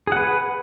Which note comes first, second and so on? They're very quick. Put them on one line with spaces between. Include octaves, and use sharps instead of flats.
G#4 F#5 B4